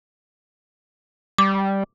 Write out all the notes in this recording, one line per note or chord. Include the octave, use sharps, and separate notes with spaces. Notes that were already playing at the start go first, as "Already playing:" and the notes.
G3 D6